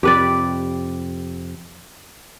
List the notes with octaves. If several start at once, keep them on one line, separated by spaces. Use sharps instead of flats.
F2 C3 G4 B4 D5